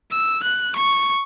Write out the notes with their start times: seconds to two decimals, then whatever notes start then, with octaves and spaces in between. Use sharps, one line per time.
0.11 E6
0.43 F#6
0.76 C#6